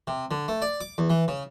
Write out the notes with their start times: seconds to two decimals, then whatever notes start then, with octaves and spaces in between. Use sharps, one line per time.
0.07 C3
0.31 D3
0.48 A3
0.62 D5
0.81 D6
0.98 E2
1.10 E3
1.28 C#3